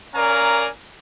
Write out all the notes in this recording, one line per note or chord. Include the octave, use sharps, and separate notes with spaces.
C#4 A#4 D5 F5 G#5 A#5